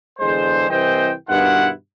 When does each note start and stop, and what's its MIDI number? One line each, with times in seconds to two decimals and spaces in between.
0.19 0.67 40
0.19 0.67 50
0.19 0.67 56
0.19 0.67 72
0.70 1.12 36
0.70 1.12 52
0.70 1.12 60
0.70 1.12 72
0.70 1.12 75
0.70 1.12 79
1.28 1.69 43
1.28 1.69 47
1.28 1.69 51
1.28 1.69 64
1.28 1.69 65
1.28 1.69 78